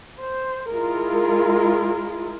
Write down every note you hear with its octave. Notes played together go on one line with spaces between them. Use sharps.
C5
G#3 E4 F4 A#4